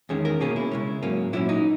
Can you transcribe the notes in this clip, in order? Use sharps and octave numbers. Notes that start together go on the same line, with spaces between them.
E2 D#3 G#3 C#4 G#4
A#4
B2 A#3 C#4 G#4
E4
C#3 G#3 C#4
G#2 F#3 A#3 C#4
A#2 F#3 C#4 E4
D#4